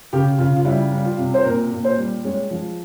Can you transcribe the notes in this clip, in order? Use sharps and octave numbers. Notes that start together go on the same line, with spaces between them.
C#3 G4
C#3 F4
F4
G3 E4
G3
F4
C3
C5
A#2 A#4
A#2
C5
G3
G#3 C#5
F3